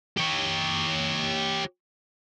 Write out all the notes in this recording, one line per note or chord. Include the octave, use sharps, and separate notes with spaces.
G4 C#5